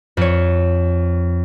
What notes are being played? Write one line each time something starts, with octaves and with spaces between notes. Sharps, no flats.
F2 C#5